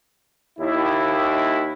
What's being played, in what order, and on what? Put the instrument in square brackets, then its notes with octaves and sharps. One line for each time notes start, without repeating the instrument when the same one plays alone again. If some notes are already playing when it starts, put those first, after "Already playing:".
[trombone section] D#2 E4